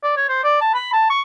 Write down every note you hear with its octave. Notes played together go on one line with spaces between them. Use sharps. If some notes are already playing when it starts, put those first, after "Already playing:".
D5
C#5
C5
D5
A5
B5
A5
C#6